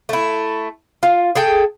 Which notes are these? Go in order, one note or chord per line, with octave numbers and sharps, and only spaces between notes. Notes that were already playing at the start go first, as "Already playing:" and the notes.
A3 E4
F4
G#4 A4 G5